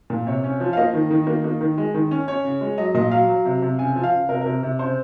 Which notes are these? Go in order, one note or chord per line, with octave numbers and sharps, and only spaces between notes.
A#2
C3 C#5
C#4
F3
F5
A#3 D#5
D#3
D#3
A#3
A#3
D#3
G#3
D#3
C#4
C#4 C#5
C#3
G#3
F#3 D#5
A#2 D#5
F#3 F5
F#3
C3
C3
C#3 G#5
F3
F5
C#3
C3 A#4
C3 A#4
C3
C#3 C5